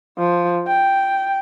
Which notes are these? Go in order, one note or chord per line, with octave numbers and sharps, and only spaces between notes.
F3
G5